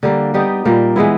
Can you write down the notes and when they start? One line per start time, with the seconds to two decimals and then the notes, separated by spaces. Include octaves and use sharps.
0.03 D3 G3 A#3
0.34 G3 B3 D#4 G4
0.65 A#2 G3 A#3
0.96 E3 G#3 B3 E4